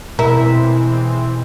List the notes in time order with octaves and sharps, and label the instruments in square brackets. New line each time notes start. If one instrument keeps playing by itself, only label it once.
[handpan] B2 [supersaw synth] E3 G#3 C4 [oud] E4 [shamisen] A#4